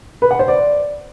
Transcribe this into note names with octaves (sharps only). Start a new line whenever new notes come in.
B4
F#5
C5
D5